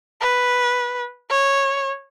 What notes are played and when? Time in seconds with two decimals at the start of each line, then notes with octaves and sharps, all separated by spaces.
0.21 B4
1.30 C#5